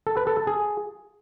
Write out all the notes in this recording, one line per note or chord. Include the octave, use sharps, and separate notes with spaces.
A4
B4
A4
A5
G#4